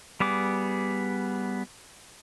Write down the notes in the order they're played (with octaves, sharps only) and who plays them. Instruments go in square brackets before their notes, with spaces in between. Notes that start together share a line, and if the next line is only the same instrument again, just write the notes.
[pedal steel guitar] G3 B3 G#4 D6